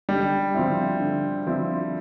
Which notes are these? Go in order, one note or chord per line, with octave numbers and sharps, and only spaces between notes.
D3 G3
F3 C4 E4
D3
F3 C4 E4